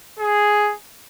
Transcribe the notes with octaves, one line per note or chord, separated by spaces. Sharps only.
G#4